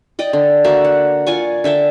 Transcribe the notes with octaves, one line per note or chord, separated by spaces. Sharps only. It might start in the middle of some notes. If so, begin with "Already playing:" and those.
D5 D#5 G5
D3
A#3 F#4 D5 E5
F#5
F4 D5 G#5 C#6
D3 E5 G5 A5